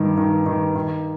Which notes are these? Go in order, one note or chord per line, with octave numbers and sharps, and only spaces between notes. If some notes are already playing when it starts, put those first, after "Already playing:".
Already playing: G2 D#3
D#3
D#3
D#3